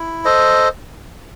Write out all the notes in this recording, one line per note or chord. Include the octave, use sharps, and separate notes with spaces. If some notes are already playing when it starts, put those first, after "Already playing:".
Already playing: E4
A4 C5 D#5